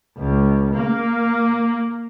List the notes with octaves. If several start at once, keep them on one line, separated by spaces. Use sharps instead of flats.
C#2
A#3